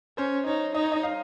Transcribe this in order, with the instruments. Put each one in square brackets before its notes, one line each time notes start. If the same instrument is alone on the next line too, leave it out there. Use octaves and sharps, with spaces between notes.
[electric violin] C#4 [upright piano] C5
[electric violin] D#4 [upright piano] C#5
[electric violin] D#4 [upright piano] D#5
[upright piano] C#5
D#5
F5